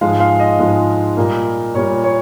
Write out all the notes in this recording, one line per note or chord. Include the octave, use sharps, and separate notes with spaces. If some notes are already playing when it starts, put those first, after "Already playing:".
G#2 F3 G#3 F5
F5
D#5
G#2 F3 G#3
A#2 G3 A#3
A#2 G3 A#3 C#5
C#5